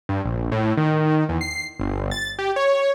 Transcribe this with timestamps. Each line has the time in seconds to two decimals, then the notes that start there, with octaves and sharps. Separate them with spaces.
0.09 G2
0.25 A#1
0.52 A2
0.77 D#3
1.29 E2
1.41 C7
1.80 G1
2.11 A6
2.39 G4
2.56 C#5